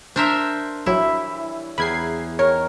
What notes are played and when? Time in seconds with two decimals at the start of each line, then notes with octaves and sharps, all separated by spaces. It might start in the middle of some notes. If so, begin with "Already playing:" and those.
0.16 D4 A#4 C5 E5
0.86 A#1 E3 F#3 G3 E4 C#5
1.78 E2 G#4 G5 A#5 B5 G#6 C7
2.39 D#3 A#4 C#5